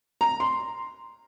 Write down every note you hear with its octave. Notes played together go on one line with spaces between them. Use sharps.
A#5
C6